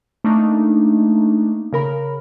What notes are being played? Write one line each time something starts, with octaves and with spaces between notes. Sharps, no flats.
A3 A#3 D4 D#4
C#3 A#4 B5